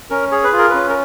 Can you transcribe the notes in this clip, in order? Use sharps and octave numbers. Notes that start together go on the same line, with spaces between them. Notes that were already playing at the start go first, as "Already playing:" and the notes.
C#4 A#4
G#4 C#5
B4
F4
A#4
C#4 B4
A#4